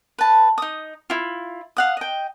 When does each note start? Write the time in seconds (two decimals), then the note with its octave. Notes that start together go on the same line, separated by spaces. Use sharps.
0.18 B4 A5
0.58 D#4 D#6
1.10 E4 F4
1.77 F5 F#5 D#6
1.97 D#5 G5